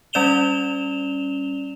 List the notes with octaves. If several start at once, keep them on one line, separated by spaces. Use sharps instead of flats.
G3 C#4 D5 E7 F7 G7